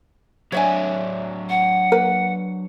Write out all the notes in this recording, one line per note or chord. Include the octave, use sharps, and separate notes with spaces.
F#3 D4 C#5 E5 G#5
F#5
A#3 B4